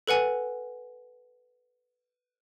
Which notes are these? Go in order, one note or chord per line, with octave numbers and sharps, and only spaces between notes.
A4 B4 F#5 G#5